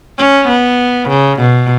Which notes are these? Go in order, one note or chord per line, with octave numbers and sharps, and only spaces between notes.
C#4
B3
C#3
B2